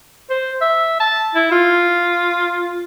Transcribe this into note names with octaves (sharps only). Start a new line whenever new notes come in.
C5
E5
A5
E4
F4